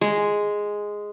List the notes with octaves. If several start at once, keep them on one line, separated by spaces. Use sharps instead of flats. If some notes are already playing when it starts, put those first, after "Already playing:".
G#3